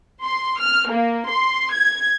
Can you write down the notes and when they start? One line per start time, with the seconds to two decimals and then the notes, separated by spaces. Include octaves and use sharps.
0.24 C6
0.60 F6
0.90 A#3
1.29 C6
1.72 G#6